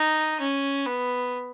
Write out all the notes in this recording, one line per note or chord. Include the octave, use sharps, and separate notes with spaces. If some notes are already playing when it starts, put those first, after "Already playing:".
Already playing: D#4
C#4
B3